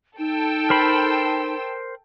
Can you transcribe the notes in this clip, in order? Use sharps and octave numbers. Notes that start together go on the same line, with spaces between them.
D#4 A4 G5 E6
A#4 C5 B5